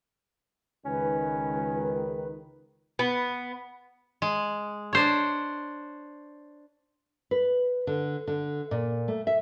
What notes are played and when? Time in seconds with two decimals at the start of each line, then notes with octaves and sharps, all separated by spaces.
0.86 C#2 D#3 C#4 B4
2.99 B3
4.22 G#3
4.93 D4 C5 C#5
7.31 B4
7.87 D3
8.27 D3
8.71 A#2
9.08 A3
9.27 E5